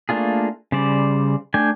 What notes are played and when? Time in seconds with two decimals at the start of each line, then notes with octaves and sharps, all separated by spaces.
0.09 A3 A#3 D4 F4 G#4
0.72 C#3 G3 C5 D5
1.54 A3 D4 G5 G#5